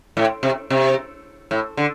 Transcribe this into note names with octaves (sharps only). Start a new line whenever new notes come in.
A2
C3
C3
A2
D3